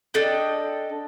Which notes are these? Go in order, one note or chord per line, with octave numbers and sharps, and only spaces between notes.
D4 A4 D#5 G5